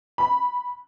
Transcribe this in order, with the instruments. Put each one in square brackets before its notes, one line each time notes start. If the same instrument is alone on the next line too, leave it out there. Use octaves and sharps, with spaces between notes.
[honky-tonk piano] B5